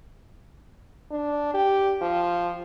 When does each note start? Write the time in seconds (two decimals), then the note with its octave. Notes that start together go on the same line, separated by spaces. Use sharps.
1.11 D4
1.54 G4
2.02 F3